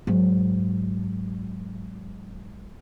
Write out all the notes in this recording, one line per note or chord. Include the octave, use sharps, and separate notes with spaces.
G#2 F#3